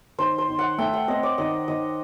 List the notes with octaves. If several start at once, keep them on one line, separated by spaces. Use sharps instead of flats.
D#3 C5
C5
D#3
F#5
A3 G5
F#5
C4 D#5
D5
D#3 D#5
D#3 D#5